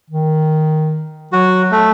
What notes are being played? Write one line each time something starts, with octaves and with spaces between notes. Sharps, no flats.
D#3
F#3 F#4
A3